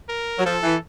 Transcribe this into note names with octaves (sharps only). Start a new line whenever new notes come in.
A#4
F#3
F3 A4
E3